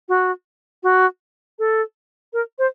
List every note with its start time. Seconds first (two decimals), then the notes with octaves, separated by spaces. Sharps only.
0.09 F#4
0.83 F#4
1.59 A4
2.33 A#4
2.59 C5